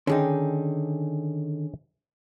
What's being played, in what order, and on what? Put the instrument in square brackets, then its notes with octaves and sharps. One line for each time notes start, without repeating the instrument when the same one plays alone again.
[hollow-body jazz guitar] D3 D#3 D#4 [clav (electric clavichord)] C#4 G#4 G5